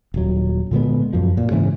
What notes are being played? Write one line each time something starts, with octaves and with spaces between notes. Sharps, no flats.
D#1 F#3
A#2 D3 G#3 B3
F#2 F3
A#2
G#2 C#3 E3